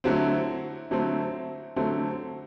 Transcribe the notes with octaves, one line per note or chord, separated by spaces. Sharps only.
D3 F#3 A3 C4 E4
D3 F#3 A3 C4
D3 F#3 A3 C4